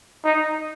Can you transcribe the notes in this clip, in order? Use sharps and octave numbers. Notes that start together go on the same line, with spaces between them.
D#4